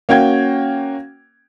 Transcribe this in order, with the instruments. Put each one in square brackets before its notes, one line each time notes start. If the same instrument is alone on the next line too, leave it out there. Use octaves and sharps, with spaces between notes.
[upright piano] A#3 C#4 F#4 G5 G#6